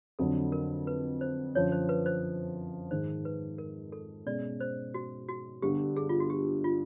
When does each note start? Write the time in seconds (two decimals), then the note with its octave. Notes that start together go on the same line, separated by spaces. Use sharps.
0.19 F2 D3 F#3 A4
0.52 A#4
0.87 B4
1.21 C5
1.55 F#2 D3 F3 C#5
1.72 C5
1.89 B4
2.06 C5
2.91 G#2 D#3 G#3 C5
3.25 B4
3.58 A#4
3.92 A4
4.26 B2 G#3 C#4 D5
4.61 C5
4.94 F#4
5.29 F#4
5.62 G1 G2 D3 G3 G4
5.97 G#4
6.09 F4
6.20 F#4
6.30 G4
6.64 F4